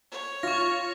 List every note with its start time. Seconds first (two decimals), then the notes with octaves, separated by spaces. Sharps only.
0.11 C#5
0.43 F4 C#6 A#6